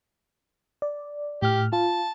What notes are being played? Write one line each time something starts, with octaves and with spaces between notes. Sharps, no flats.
D5
A2 G4 F6
F4 A5